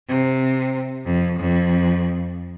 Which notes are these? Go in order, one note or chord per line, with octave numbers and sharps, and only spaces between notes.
C3
F2
F2